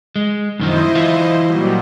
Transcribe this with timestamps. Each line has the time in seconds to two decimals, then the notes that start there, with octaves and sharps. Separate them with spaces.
0.16 G#3
0.60 F#2 D#3 F3 E4 C5 D#5
0.95 E3 F4
1.47 A#2 F#3 G3